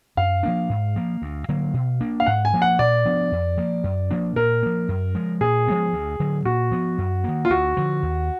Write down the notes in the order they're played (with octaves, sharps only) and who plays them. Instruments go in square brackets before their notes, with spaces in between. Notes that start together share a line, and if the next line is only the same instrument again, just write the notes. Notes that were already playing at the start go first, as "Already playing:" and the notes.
[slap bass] F#2 [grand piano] F5
[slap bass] F3 A#3 D4
G#2
F3 A#3
D2
D3 F#3 A#3
B2
A#3 D4
[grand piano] F5
[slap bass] G#2 [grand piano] F#5
[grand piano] G#5
[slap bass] F3 A#3
[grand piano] F#5
[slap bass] A#2 [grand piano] D5
[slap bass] F3 B3 D4
F2
F3 A#3
F#2
F3 A#3 D4
[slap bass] A#2 [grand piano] A#4
[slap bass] F3 A#3
F#2
F3 G#3
[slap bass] A#2 [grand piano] G#4
[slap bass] F3 G#3 B3
D2
D3 F#3
[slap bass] A#2 [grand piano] F#4
[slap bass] F3 B3
F#2
D#3 A#3
[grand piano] F4
[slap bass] D2 [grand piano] F#4
[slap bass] D3 F3
D#2